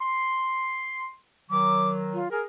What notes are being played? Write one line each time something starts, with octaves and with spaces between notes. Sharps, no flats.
C6
D#3 F#3 D6
F4
G#4 A#4